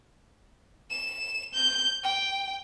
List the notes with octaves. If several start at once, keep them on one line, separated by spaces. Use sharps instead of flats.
E7
G6
G5